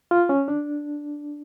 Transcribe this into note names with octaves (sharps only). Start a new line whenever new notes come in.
F4
C#4
D4